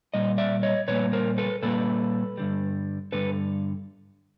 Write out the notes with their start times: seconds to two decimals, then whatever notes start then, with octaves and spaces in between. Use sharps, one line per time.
0.14 A#2 G3 D#5
0.38 D5 E5
0.63 C#5 D#5
0.88 A#2 G3 A#3 B4 C#5
1.13 A#4 C5
1.38 A4 B4
1.62 A#2 G3 A#3 A4 B4
2.38 G2 D3 G3
3.12 G2 D3 G3 A4 B4